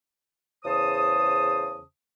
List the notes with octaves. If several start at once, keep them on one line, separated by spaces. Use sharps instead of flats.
E2 C#3 C5 A5 D#6